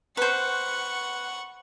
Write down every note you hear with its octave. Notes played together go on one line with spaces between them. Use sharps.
B4 C5 F#5 C#6